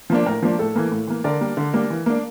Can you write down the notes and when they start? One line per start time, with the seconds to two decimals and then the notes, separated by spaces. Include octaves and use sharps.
0.10 F3 A#3 D4
0.26 A2 A#4
0.42 F3 A#3 D4
0.59 A2 A4
0.75 E3 A#3
0.91 A2
1.07 E3 A#3
1.24 D3 A#4 D5
1.41 G3 A#3 D4
1.57 D3
1.73 G3 A#3 D4
1.90 E3
2.06 A#3 D4